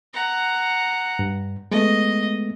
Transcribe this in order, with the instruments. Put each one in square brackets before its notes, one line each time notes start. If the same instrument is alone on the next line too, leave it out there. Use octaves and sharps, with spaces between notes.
[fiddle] F#5 A#5
[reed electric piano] G2
[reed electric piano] G#3 A3 B3 [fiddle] D#5